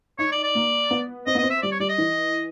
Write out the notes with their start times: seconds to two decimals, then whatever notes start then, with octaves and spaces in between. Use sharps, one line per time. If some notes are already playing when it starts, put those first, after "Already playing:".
0.19 D#4 C#5
0.32 D5
0.43 D5
0.55 A#3
0.91 B3
1.27 C4 D#5
1.35 B3
1.38 D#5
1.43 C4
1.50 E5
1.63 G3 D5
1.72 C#5
1.80 G3 D5
1.89 D#5
1.98 E3